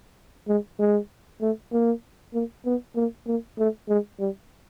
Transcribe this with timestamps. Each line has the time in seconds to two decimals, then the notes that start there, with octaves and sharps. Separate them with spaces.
0.48 G#3
0.80 G#3
1.41 A3
1.73 A#3
2.34 A#3
2.66 B3
2.96 A#3
3.27 A#3
3.58 A3
3.89 G#3
4.20 G3